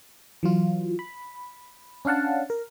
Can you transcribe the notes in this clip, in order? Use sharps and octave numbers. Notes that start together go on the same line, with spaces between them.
E3 F#3 F4
B5
C#4 D4 F5 F#5 A5
A#4